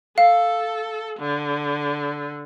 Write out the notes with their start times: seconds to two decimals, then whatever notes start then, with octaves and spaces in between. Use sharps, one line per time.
0.18 A4 F5
1.19 D3